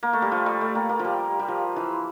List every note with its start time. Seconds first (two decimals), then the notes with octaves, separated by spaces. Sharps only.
0.03 A#3
0.13 A3
0.22 G3
0.32 F3
0.46 G3
0.61 A3
0.75 A#3
0.89 A#3
0.99 F3
1.05 G3
1.39 G3
1.48 F3
1.76 E3